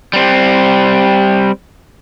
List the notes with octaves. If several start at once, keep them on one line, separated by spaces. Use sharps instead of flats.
G3 C4